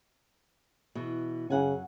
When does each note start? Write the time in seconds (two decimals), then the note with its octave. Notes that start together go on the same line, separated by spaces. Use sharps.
0.95 B2 E3
1.50 F#2 C#3 F#5 G#5